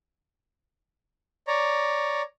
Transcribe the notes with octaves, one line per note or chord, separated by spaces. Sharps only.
C#5 D5 A#5